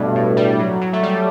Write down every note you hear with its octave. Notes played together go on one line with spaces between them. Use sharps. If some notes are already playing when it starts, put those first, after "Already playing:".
Already playing: G2 B2 G3 A3
A2
G3
F#3
F#3
A3
G3